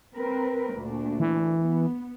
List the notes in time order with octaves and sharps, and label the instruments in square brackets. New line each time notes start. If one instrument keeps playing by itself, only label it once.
[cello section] C4 A#4 B4
D2 A#2 D4
[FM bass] E3
[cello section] B3